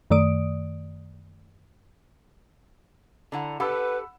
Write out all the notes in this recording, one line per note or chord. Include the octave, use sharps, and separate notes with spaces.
F#2 D#3 A3 D5 D#6 D7
D3 E4 F#5 A#5
G4 A4 B4 F#5 B5 E6